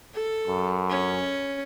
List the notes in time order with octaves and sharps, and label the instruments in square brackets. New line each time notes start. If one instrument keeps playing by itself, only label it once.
[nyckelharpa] A4
[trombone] F#2
[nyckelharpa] C#4